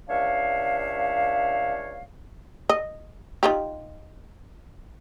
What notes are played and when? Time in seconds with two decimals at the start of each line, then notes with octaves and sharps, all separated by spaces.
0.09 C#2 D4 C#5 E5 F5
2.69 D#5
3.43 D#4 F4 G4